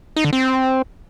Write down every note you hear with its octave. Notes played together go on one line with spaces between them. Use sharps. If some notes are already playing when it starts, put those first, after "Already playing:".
D#4
D3
C4